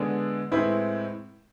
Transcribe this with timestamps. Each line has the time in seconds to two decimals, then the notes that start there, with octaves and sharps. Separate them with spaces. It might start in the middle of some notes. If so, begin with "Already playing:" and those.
Already playing: D3 G#3 B3 D4 G#4
0.51 A2 G#3 C4 E4 B4